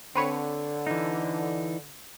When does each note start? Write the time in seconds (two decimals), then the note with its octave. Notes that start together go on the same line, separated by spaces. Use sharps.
0.15 D3 C4 B4 C#5
0.87 E3 D#4